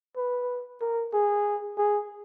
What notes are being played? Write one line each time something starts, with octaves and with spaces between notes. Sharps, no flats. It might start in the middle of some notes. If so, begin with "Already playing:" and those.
B4
A#4
G#4
G#4